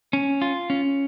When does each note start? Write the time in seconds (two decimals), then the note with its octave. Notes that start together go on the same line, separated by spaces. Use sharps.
0.13 C#4
0.42 F4
0.70 C#4